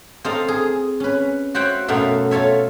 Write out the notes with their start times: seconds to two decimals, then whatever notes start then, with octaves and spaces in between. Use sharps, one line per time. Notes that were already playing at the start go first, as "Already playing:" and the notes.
0.24 C4 F4 A4 D#5 F5 A#5
0.48 G#4
1.00 C#4 B4
1.55 F#4 C5 C#5 E5 F#5 G5
1.88 F#2 B2 F#3 A3 E5 F5
2.31 F4 A4 C#5 E5